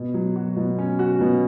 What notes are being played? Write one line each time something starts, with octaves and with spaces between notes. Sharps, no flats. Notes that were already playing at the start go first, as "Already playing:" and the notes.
Already playing: B2
F#3
F#4
B2
C#4
F#4
B2